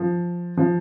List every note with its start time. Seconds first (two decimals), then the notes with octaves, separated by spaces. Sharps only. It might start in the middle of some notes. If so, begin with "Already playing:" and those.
Already playing: F3
0.57 F3